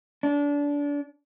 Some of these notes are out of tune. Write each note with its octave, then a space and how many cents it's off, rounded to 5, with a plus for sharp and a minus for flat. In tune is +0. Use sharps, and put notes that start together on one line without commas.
D4 -25